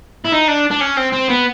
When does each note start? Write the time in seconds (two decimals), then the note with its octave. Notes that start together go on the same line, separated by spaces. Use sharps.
0.25 E4
0.32 D#4
0.48 D4
0.71 D4
0.80 C#4
0.97 C4
1.12 C4
1.29 B3